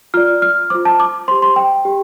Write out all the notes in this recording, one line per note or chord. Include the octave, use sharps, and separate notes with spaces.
F4 D5 F6
F6
F4 C5 D6
A5
D6
G4 C5 C6
C6
G5
G4